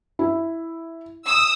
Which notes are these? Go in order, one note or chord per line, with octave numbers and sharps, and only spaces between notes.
E4
D#6 E6